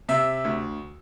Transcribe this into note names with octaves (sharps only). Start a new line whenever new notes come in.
C3 E5
D2